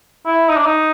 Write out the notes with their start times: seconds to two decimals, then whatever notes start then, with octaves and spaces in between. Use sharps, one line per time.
0.26 E4
0.48 D#4
0.57 D4
0.66 D#4